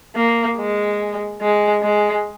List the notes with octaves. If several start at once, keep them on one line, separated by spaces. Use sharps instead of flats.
A#3
G#3
G#3
G#3